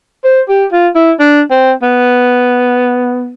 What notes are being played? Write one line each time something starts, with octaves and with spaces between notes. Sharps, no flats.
C5
G4
F4
E4
D4
C4
B3